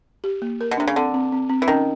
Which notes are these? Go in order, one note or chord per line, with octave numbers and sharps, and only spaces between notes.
G4
A#3
A#4
B2
C3 D4
C#3
D3 C4
C4
C4
C4
E3
D#3 C#4